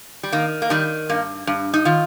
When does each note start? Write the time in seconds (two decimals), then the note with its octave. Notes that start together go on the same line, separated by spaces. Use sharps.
0.23 G3
0.32 D#3 A#3
0.62 A#3
0.70 D#3 G3
1.09 G2 A#3
1.47 G2
1.74 D#4
1.85 D#3 F4